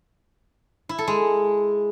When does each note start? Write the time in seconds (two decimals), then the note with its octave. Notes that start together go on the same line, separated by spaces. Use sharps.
0.89 E4
0.98 A4
1.08 G#3